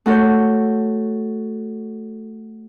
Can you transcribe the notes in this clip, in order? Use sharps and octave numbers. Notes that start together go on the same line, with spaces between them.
A3 F#4 A4 C#5 G6